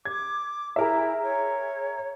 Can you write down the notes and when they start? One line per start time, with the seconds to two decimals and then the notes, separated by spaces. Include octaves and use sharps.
0.05 D6 G#6
0.76 E4 G#4 A#4 E5
1.23 C#5